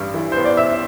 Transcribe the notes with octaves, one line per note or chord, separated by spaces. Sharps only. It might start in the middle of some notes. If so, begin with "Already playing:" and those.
Already playing: A1 G2
E3
B3 C5
D5
B3 E5